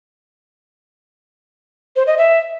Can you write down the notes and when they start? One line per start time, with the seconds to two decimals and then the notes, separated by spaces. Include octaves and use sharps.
1.96 C5
2.07 D#5
2.18 E5